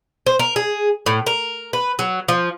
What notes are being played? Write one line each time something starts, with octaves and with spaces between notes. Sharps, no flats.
C5
A#4
G#4
A2
A#4
B4
F#3
F3